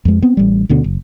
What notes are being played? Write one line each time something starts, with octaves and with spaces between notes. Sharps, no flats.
F2 G#3
B3 C4
A1 G3
D2 B2 D3
F#1